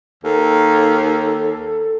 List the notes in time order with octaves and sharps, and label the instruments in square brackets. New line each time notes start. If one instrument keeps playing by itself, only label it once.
[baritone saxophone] D#2 [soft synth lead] A4